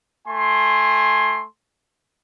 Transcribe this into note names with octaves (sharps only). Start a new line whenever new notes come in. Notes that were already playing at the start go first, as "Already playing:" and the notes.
A3 G#5 C6